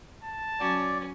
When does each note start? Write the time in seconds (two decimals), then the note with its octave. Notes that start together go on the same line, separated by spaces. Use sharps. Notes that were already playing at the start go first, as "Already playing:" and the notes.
0.24 A5
0.61 F#3 C#4 D5